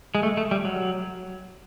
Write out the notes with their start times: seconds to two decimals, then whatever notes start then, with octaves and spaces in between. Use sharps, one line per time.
0.15 G#3
0.23 A3
0.37 A3
0.51 G3
0.65 F#3